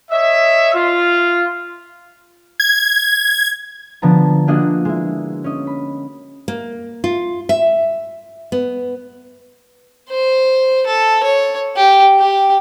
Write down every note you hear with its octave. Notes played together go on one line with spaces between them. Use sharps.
C#5 D#5 E5
F4
G#6
D3 F3 B3 A5 A#5
A#3 D4 F4 F#4 G#4 D#5
G#3 E4
C#4 D#5
B5
A#3
F4
E5
B3
C5
A4
C#5
G4
G4